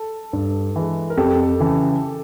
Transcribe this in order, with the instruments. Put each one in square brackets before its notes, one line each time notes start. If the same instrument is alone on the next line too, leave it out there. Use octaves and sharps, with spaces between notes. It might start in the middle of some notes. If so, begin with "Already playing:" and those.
Already playing: [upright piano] A4
[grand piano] G2
E3 G#3
[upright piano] A#4
[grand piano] F2 [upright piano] G4 A4
[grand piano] C#3 E3